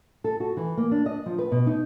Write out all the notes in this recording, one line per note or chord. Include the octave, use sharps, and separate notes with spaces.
A4
F#4
E3
A#3
D4
D#5
F3
B4
B2
D#4